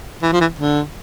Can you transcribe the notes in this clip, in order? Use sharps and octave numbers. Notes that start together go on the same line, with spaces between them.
E3
F3
E3
D3